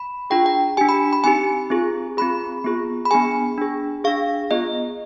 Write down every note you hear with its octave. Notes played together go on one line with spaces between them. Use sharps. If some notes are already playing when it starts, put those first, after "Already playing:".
Already playing: B5
D4 F4 G#4 G5
G5
D4 G4 G#5
B5
B5
C4 D#4 G4 G#5
C4 F4 G#4
C4 F4 G#4 B5
B3 F4 G#4
B5
B3 D4 G#4 G#5
D4 G#4
D4 G#4 F5
B3 F4 G#4 D#5